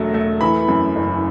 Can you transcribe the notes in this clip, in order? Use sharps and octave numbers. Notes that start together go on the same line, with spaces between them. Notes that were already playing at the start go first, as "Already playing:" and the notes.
Already playing: E1 F#3 A3
A3
E3 B5
F#2
F#1